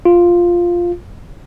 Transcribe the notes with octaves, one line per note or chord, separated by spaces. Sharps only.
F4